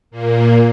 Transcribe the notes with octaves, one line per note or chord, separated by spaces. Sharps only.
A#2 A#3